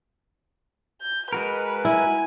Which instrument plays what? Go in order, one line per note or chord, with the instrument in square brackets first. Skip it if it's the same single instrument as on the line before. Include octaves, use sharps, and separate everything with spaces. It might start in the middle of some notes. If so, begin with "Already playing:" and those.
[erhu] G6
[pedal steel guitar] G#3 F#4 A#4 [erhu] B4
[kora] E4 [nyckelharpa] G#5